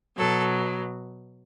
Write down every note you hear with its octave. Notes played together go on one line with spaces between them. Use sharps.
B2 F#3 A4